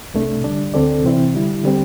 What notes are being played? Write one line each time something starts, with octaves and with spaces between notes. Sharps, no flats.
C2 C3 A3 D4
D3 G3 D4
D2 D3 C4 A4 D5
C3 E3 C4 E4
D3 G3 E4
D3 G3 C4 G4